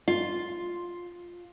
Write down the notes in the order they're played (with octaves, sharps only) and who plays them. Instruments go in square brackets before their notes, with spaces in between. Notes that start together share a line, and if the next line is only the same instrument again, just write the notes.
[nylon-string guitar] F4